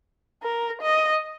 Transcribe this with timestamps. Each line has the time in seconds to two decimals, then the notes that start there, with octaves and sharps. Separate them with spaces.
0.43 A#4
0.82 D#5